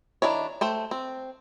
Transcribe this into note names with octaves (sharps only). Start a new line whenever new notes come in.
D#3 F3 D4 E4 C#5
A3 C5 G5
C4